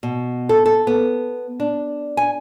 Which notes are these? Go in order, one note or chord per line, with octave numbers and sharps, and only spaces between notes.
B2
A4
A4
B3
D4
G#5